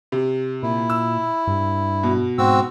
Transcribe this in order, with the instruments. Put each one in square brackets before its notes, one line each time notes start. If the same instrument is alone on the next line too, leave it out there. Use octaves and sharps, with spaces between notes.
[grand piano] C3
[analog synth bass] A#2 [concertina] E4
[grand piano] E6
[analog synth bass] G2
[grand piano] B2
[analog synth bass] G#2 [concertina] C4 F#4 E6